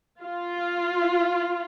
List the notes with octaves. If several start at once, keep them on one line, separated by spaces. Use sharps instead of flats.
F4